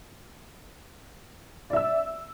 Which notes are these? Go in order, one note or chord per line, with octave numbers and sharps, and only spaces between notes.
D5 E5 E6